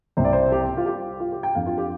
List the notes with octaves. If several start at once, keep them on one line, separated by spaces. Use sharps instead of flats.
C2 C3 G3 C4 C5
D5
C5
G4
F4
G4
F4
G4
G5
F2 F3 D4 F5
F4
G4